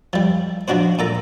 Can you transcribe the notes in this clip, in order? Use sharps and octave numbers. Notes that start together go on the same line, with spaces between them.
F3 G3
F3 F#3 D4 F#4 C5
A#2 A4 A#5